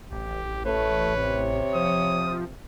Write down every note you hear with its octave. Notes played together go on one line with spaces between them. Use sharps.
A1 G4
A3 B4 C#5
C3
F3 D#6